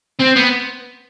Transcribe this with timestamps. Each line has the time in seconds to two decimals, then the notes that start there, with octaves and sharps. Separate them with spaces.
0.19 C4
0.36 B3